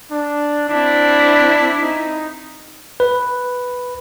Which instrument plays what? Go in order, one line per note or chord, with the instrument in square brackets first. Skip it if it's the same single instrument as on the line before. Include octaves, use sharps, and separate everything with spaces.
[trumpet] D4
[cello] C4 E4 [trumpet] D4
[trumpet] D#4
[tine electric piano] B4